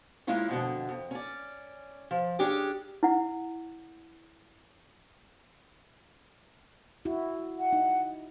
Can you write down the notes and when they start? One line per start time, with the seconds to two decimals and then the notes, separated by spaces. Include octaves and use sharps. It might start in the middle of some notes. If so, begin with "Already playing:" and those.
0.27 G#3 A#3 C#4 E4 F4 C#5
0.48 F2 B2 D3
0.89 F2
1.11 C#4 D5
2.11 F3
2.39 C#4 D4 G4 G#4 D5
3.03 E4 F#5
7.05 E4 F#4
7.59 F#5
7.73 D#4